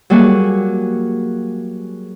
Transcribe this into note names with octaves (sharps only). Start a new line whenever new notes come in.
F#3 G3 A#3 F#4 G#4